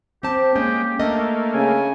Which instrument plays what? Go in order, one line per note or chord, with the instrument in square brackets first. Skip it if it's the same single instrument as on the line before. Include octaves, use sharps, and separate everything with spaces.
[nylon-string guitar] C4 C5 A5 [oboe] G4
[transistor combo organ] G#3 G5 [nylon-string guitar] A#3 C#4
[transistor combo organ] A3 A#3 [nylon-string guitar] D4 D#5
[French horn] C#3 [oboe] G#5